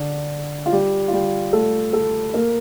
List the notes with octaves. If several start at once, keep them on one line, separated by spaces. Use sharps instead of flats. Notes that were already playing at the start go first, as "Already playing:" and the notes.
Already playing: D3 D4
F4
G3 G4
F4
G3 G4
A3 A4
A3 A4
A#3 A#4